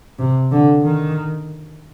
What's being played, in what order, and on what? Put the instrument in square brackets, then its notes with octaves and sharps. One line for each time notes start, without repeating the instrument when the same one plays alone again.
[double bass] C3
D3
D#3